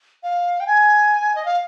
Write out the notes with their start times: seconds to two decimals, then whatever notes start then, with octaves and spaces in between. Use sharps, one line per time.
0.23 F5
0.60 G5
0.67 G#5
1.35 D#5
1.45 F5